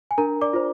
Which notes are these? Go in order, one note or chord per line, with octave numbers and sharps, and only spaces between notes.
G#5
D4 A#4 A#5
D5 D6
F4 C5